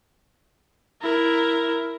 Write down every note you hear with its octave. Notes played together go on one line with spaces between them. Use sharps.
E4 A#4